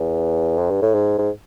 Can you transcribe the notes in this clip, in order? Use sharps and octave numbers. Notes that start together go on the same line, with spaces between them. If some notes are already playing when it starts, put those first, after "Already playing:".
Already playing: E2
F2
G2
A2
G#2
G#2